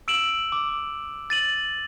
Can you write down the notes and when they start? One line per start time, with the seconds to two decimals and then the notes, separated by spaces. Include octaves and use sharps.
0.08 E6 D7 E7 F#7
0.52 D6
1.30 A6 D#7 F#7